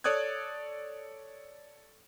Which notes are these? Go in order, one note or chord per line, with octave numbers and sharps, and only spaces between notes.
A4 C#5 D5 D#6 F#6 G#6